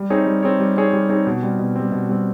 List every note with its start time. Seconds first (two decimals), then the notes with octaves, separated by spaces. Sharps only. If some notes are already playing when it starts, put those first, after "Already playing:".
Already playing: G3
0.10 C4 D#4 G#4 C#5
0.27 G3
0.43 C4 D#4 G#4 C#5
0.60 G3
0.76 C4 D#4 G#4 C#5
0.93 G3
1.09 C4 D#4 G#4 C#5
1.27 B2
1.43 G3 C4
1.59 B2
1.76 G3 C4
1.92 B2
2.09 G3 C4